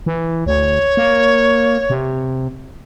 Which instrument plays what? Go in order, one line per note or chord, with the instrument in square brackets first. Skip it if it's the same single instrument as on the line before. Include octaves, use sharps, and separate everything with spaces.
[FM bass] E3
[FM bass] D2 [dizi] C#5
[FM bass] A#3
C3